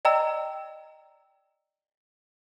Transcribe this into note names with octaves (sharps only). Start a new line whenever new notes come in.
D5 D#5 G5 A#5 E6